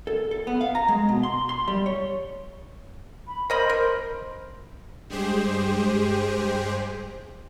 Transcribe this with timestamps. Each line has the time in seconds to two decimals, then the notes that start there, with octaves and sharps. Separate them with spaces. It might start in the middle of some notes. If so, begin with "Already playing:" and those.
0.07 A4
0.31 A4
0.47 B3
0.61 F5
0.75 A#5
0.88 G#3
1.09 B2
1.23 C6
1.49 C6
1.68 G3
1.86 C#5
3.27 B5
3.50 A#4 C5 D#5 B5
3.70 A#4
5.10 G2 G#3 G4 G#4 C5